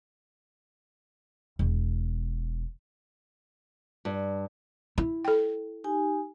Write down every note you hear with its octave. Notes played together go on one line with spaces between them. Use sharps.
E1
G2
E4
A4 G5
D#4 G4 G#5